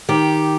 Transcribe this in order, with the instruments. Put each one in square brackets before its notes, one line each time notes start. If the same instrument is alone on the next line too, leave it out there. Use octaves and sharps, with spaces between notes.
[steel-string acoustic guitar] D#3 G4